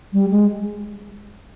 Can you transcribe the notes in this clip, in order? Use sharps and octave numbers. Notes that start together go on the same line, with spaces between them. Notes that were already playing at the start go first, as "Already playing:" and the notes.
G3
G#3